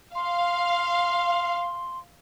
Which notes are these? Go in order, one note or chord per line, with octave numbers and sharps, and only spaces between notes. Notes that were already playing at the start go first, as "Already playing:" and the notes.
F5 C6